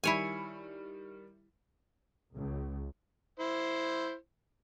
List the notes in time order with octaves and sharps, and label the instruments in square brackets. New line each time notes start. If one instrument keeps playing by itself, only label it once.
[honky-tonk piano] D#3 G3 [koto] E4 C#5 G#5
[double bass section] C#2
[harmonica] E4 C5